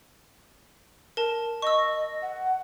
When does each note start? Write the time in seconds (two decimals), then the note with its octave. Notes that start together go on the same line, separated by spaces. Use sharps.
1.17 A#4 A5
1.62 D#5 C#6 E6
2.22 F#5